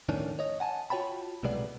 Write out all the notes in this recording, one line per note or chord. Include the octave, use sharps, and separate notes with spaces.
F2 A2 D#3 C#4 D4
C#5 D#5
F#5 G#5 A5
F4 F#4 C#5 G5 A5 B5
B1 A2 C3 G#3 B3 D5